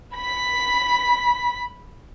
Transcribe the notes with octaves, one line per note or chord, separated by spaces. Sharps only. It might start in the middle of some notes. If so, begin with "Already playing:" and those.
B5 B6